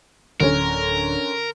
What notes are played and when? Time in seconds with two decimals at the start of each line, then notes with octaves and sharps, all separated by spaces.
0.40 D1 D3 C#4 A#4